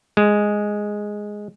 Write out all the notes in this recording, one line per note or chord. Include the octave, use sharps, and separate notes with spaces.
G#3